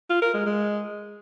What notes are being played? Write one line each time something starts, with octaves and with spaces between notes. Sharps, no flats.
F4
A#4
G#3
G#3